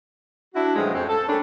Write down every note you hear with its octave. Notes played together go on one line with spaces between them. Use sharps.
D4 E4 F#4
A2 C#3 E3 F3 G3 G#3
F2 C4 C#4
A4
G3 A3 A#3 C#4 D4